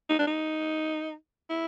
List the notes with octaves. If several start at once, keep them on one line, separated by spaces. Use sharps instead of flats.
D#4
D4
D#4
E4